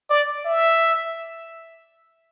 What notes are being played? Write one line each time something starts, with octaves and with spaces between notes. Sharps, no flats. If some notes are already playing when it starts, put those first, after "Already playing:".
D5
E5